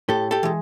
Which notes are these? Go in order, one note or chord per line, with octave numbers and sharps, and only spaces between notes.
A2 G4 A4
G4 A4
E3 G#3